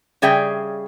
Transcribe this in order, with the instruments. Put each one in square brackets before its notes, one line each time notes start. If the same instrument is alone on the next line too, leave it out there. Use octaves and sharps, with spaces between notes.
[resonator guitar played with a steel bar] C#3 G3 G#4 E5 G5